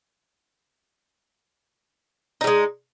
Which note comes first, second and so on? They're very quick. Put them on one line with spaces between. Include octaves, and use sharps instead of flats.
D#4 G3 G#3